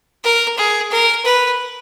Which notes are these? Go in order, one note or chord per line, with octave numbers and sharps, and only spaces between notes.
A#4
G#4
A#4
B4